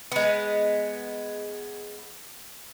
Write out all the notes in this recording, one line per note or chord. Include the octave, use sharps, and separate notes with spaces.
G#3 B3